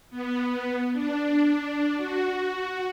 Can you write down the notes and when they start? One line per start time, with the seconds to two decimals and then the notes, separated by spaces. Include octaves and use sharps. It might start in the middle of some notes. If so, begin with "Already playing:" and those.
0.10 B3
0.93 D4
1.97 F#4